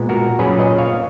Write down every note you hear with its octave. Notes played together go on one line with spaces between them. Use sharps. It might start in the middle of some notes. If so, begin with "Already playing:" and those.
Already playing: A#2 G#3 B3
F#4 A#4
A#2 F#3 C#4 G#4 B4
B4 D#5
C#5 F5